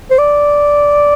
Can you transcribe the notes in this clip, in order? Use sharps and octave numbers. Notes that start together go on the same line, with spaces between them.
C5
D5